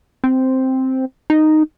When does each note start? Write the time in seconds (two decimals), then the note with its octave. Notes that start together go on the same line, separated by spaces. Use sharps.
0.24 C4
1.30 D#4